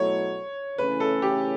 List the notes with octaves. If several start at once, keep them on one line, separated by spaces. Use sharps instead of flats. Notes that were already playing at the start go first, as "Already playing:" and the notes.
Already playing: B2 F#3 A3 E4 A4 C#5
C#3 E3 A3 C#4 E4 B4
A4
G4